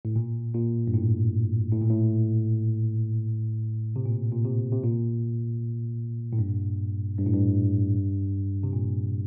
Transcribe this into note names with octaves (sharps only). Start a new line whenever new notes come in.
A2
A#2
A#2
G2
A2
A2
A#2
A2
C3
A#2
A#2
C3
C3
A#2
A2
G2
G2
A2
G2
C3
A#2